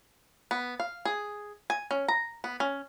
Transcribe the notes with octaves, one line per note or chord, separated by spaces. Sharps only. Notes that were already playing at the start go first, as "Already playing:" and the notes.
B3
F5
G#4
G#5
C#4
A#5
B3
C#4